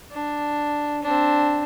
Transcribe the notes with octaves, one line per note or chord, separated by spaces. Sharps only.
D4
C4 D4